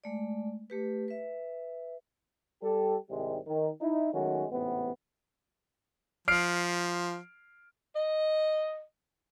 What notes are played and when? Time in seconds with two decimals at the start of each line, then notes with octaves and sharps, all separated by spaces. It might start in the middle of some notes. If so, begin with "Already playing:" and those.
0.04 G#3 A3 D5
0.70 A3 G4 B4
1.08 B4 E5
2.63 G3 G4 A4
3.10 C2 G#2 C3 D#3 G3 G#3
3.46 D#3
3.81 D#4 E4
4.13 D#3 F#3 G#3 A3 C#4 F#4
4.51 A1 G#2 C3 B3
6.28 F3 F6 C7 D7
7.96 D#5